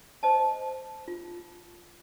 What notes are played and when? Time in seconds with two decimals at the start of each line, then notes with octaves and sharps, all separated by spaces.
0.23 C5 D#5 A5
1.08 F4